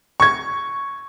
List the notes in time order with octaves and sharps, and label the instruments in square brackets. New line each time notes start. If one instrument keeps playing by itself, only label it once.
[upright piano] C#6 G#6